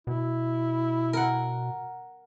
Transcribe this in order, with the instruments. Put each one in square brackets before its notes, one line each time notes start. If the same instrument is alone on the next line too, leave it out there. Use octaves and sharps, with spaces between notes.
[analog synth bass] B2 [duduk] E4
[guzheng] A#4 F#5